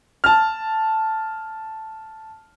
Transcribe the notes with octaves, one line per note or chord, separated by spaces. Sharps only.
A5 F6